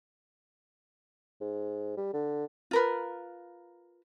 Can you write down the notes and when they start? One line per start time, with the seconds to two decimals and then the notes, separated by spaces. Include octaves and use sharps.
1.41 G#2
1.97 G3
2.14 D3
2.71 F4 A#4 B4